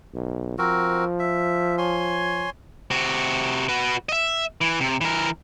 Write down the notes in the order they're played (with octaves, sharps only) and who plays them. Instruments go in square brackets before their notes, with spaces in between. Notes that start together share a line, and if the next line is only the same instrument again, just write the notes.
[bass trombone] B1
[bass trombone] F3 [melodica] C4 F#4 A#4
[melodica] E5
C#5 G#5 C6
[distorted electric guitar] C3 F#4
F#4 B4
D#5 E5
E3
C3
E3 A#4